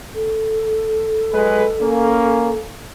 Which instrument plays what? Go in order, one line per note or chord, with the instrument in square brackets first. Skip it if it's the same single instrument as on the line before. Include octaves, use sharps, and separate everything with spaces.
[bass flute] A4
[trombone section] F#3 G#3 B4
A#3 C#4